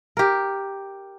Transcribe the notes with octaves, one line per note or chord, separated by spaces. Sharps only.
G4 A#4